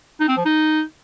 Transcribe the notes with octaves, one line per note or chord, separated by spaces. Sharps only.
D#4
C4
F3
D#4